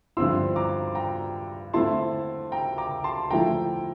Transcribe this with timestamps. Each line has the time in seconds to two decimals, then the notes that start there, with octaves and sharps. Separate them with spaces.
0.17 G2 D3 F3 C4 E4 C6 E6
0.56 A#5 D6
0.95 G5 A#5
1.74 D3 A3 C4 E4 A5 C6
2.52 G5 A#5
2.78 A#5 D6
3.04 A5 C6
3.30 D3 F3 A3 E4 G5 A#5